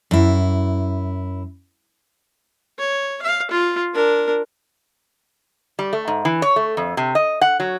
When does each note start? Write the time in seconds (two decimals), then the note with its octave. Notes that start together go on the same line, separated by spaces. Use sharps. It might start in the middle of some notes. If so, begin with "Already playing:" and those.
0.11 F#2 E4
2.78 C#5
3.22 F5
3.51 F4
3.94 D4 A#4
5.79 G3
5.93 A3
6.08 G#2
6.25 E3
6.42 C#5
6.56 A3
6.77 F2
6.97 C3
7.15 D#5
7.41 F#5
7.60 F#3